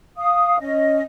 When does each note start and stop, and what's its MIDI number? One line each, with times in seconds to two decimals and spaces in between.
0.16 0.58 77
0.16 0.58 87
0.59 1.01 61
0.59 1.01 75